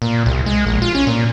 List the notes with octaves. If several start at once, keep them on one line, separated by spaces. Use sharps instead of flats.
A#2
C2
G#3
A#1
F4
C#4
A#2